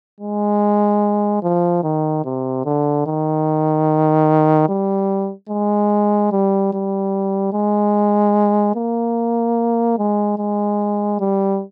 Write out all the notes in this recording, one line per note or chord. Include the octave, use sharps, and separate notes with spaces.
G#3
F3
D#3
C3
D3
D#3
G3
G#3
G3
G3
G#3
A#3
G#3
G#3
G3